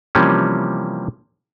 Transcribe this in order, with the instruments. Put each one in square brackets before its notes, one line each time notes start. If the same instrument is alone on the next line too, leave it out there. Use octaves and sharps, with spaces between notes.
[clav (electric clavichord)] C3 E3 F3 G3 A#3 C#4